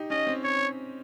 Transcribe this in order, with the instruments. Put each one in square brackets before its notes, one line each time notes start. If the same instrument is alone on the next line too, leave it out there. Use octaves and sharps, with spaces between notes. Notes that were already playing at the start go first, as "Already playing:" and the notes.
Already playing: [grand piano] D#4 G4
[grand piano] C#4 [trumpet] D#5
[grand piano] C4
[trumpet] C#5